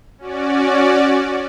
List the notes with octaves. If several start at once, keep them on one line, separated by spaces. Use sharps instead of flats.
C#4 F#4 D5